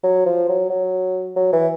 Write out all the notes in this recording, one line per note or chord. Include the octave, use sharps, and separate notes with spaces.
F#3
F3
F#3
F#3
F#3
E3